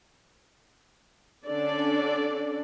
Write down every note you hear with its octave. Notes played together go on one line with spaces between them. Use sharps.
D3 C#4 D4 A4 D5